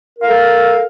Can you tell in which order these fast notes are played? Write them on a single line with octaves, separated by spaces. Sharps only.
A#4 F5 A4